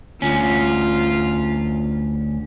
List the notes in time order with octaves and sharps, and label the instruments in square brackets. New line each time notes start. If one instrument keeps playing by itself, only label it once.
[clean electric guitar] D2 C#4 [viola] F4